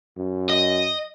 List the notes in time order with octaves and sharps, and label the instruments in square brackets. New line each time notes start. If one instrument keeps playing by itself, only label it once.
[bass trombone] F#2
[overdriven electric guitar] D#5